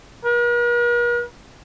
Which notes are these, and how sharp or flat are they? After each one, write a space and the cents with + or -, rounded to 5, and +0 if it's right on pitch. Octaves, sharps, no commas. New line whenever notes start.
A#4 +45